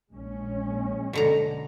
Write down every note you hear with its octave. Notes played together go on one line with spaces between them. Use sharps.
A#1 G#3 C#4
B2 D3 A#5